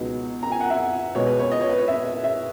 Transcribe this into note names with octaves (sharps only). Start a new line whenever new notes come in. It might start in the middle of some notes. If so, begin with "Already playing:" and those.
Already playing: C#2 B2 F#3 B3 D#4
A#5
G#5
F#5
E5
B2 G#3 B3 C#5
B4
C#5
D#5
C#5
B4
C#5
E5
E5